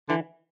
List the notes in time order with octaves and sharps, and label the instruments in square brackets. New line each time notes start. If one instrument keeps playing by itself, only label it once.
[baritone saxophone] D3 [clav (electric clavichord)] E3